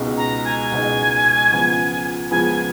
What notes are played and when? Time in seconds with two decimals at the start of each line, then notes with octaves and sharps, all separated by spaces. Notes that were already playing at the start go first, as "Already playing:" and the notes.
Already playing: C#2 B2 G#3 B3 D#4
0.17 A#5
0.45 G#5
0.71 C#2 B2 G#3 B3 D#4
1.51 C#2 C#3 F3 B3
2.31 C#2 C#3 F3 B3 G#5